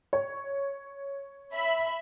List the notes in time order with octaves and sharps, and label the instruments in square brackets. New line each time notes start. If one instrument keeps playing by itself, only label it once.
[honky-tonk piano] C#5
[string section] E5 B5